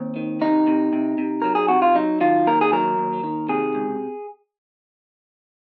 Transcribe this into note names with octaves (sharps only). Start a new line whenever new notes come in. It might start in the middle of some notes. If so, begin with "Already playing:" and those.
Already playing: D#2 C4
D#3
C3 D#4
C3
C3
C3
F#3 A#4
G#4
C3 F#4
F4
F#3 D#4
D#3 F4
D#2 A#4
G#4
F#3 A#4
D#2
D#3
C3 G#4
C#2